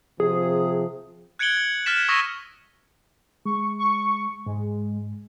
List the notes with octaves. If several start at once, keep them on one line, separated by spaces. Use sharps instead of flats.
C3 F3 G#4
F#6 G#6 C#7 D7 F#7 G7
G#6
F6 F#6 A6 B6 E7
C#6 D#6 E6 A#6 B6 D#7
G#3 C#6
C#6
G#2 G#3